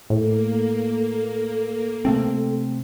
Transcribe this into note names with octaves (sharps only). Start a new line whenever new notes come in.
A2 A#3 A4
A4
C3 A3 C4